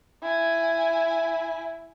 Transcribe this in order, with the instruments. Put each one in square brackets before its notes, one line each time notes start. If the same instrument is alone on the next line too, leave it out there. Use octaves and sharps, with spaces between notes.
[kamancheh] E4 G#5